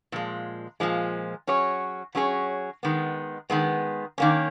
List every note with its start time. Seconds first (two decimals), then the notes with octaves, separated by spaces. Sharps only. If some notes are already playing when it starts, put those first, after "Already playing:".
0.12 A#2 F3 G#3
0.80 A#2 F3 G#3
1.47 F#3 C#4 G#4 C#5
2.15 F#3 C#4 G#4 C#5
2.83 D#3 G#3 B3
3.50 D#3 G#3 B3
4.18 D#3 A#3 C#4